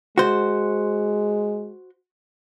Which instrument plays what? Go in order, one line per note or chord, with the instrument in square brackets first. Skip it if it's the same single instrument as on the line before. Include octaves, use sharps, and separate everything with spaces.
[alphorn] G#3 [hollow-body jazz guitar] F#4 C5